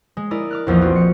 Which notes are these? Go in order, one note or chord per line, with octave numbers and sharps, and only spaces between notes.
G#3
E4 A#4 D5 D#5
D6 F6 F#6
A#1 E2 F3 F4 D#5
C4 F4 F#4
C#7